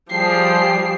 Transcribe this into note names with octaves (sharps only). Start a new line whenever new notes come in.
F3 G3 G#4 G5 A5 C7